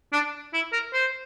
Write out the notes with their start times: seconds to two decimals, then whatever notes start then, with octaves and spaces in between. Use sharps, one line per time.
0.13 D4
0.53 E4
0.72 A#4
0.93 C5